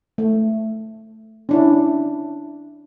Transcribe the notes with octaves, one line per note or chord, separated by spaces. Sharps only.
A3
C#4 D4 E4